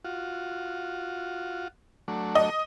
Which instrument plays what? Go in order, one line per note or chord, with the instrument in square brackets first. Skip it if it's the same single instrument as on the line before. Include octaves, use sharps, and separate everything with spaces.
[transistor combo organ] F4 F#4
F#3 A3 D4
[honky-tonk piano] D#5